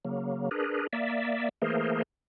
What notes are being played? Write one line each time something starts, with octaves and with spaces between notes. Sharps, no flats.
C#3 F#3 A#3
D4 G#4 A#4 B4
A#3 D5 E5
E3 A3 A#3 G#4 A#4 C5